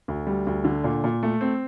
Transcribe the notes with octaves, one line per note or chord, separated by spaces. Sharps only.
D2
G3
D2
D3
A#2
A#2
A3
C4